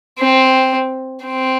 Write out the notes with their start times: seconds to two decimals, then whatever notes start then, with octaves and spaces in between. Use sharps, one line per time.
0.19 C4
1.25 C4